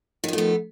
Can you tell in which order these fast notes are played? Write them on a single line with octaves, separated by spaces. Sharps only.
D#3 F3 A3 B3